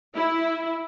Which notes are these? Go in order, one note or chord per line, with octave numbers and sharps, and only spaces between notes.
E4